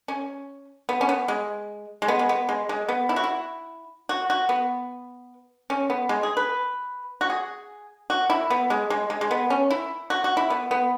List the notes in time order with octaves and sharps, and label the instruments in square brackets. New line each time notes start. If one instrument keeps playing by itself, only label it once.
[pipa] C#4
B3
C#4
B3
G#3
G#3
B3
G#3
B3
G#3
G#3
B3
E4
F#4
E4
F#4
F#4
B3
C#4
B3
G#3
G#4
B4
F#4
G#4
F#4
E4
B3
G#3
G#3
G#3
G#3
B3
C#4
E4
F#4
F#4
E4
B3
B3